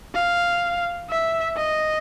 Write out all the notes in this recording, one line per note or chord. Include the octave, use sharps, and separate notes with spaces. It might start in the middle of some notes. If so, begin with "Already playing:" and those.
F5
E5
D#5